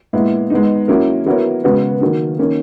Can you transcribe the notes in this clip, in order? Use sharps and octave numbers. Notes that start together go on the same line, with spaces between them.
A#2 G#3 B3 E4
G#3 B3 D#4
F#3 A#3 C#4 E4 A#4
F#3 B3 E4 A#4 C#5
C#3 G#3 B3 F#4 B4
D#3 F#3 A#3
D#3 A#3 C#4